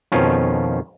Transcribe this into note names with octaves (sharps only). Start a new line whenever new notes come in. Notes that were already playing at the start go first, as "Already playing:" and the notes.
F2 B2 D#3 F3 C#4 F4